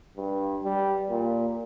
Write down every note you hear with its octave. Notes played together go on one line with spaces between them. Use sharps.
G2
G3
A#2